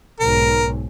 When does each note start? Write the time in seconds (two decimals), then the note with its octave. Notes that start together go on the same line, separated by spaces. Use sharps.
0.20 B1 G#2 A#4